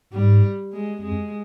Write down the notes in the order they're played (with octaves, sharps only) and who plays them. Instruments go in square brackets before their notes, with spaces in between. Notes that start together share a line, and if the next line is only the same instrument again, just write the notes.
[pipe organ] G#2 [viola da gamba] G3
[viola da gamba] G#3
[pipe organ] F2 [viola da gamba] G#3